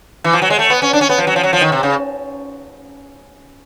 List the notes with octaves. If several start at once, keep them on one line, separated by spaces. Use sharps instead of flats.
E3
F3
F#3
G#3
A3
B3
C#4
D4
C#4
B3
F3
F#3
F3
F#3
F3
D#3
C3
C#3